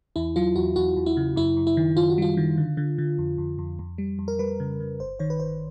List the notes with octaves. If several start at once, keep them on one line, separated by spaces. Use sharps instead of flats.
E2 E4
F#3 F4
E2 F#4
E2 F#4
E2
E4
C#3
F#2 E4
F#2
E4
D#3
F#2 F4
F#4
G3 F4
D#3
D3
D3
D3
F2
F2
F2
F2
G3
F2
A#4
G3 B4
C#3
C#3
G1 C5
D#3 C#5
B4
G1 C5